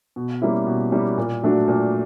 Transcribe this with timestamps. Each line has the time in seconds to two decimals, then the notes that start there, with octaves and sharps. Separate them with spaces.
0.16 B2
0.42 G3 A#3 C#4 E4
0.66 B2
0.92 G3 A#3 C#4 E4
1.18 A#2
1.42 F#3 A3 D4 F#4
1.68 A#2